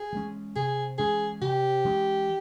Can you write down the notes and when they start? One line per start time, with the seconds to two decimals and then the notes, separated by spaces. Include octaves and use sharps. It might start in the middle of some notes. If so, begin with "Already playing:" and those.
Already playing: G#4
0.12 E3 G#3 C#4
0.56 C3 G#4
0.98 E3 G#3 C#4 G#4
1.41 C3 G4
1.84 E3 G#3 C#4